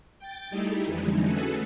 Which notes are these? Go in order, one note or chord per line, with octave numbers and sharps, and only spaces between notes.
G5 A6
G3 A3 D#4 E4 G4 G#4
F2 D3 E3 G3 G#3 D#4
A3 C#4 F#4 G#4 A4 B4